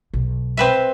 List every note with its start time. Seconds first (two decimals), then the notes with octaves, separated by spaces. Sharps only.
0.14 B1
0.57 C4 B4 E5